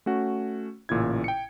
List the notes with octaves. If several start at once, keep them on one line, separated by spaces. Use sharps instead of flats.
A3 C#4 F#4
A1 A#2 C#3 E4 G#6
G5 C#7